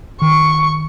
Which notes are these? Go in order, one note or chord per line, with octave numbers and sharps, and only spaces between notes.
D#3 C#6